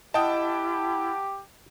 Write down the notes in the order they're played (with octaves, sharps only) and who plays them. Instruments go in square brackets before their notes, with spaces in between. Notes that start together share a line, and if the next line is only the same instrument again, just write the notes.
[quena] E4 [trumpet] G4 [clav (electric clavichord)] D#5 [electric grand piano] F#5 G5 A5